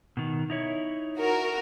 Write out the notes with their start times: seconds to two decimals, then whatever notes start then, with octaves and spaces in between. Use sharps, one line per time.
0.17 B2 D#3
0.50 D#4 E4 C#5
1.19 F#4 A#4